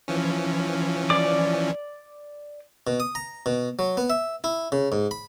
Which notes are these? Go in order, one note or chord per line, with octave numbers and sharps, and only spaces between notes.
E3 F3 C#4
D5 D6
B2
D#6
A#5
B2
F#3
B3
E5
E4
C#3
G#2
B5